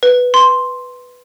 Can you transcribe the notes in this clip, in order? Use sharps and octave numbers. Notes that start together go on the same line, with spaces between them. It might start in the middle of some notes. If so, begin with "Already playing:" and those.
B4
C6